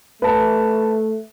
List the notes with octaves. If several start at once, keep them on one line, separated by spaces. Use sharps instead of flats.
A3 B4 A5